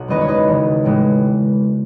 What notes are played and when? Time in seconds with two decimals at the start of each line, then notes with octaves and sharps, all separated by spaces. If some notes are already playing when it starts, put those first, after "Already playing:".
Already playing: B1 F#5
0.08 F#1 E2 D#3 G#3 C#4 B4 D#5
0.21 C#5
0.28 B4 D#5
0.47 E1 D#2 C#3
0.84 A1 A2 E3 G#3